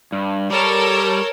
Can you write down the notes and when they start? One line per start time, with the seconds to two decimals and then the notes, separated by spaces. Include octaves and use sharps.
0.12 G2
0.50 G3 A4 A#4 C#5